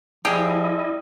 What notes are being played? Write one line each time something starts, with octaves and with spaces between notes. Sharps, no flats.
F3 G3 E4 G4 G#4 D#5